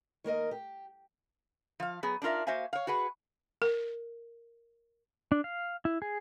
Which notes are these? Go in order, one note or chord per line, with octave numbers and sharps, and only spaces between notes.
D#3 A#3 A#4 D#5
G4
F3 F5
F#3 B3 G#4
D4 D#4 F4 A#4 E5
A#3 F#4 C5 E5 F5 G#5
C#5 F5
F#4 G#4 B4 F#5
A#4
D4
F5
E4
G#4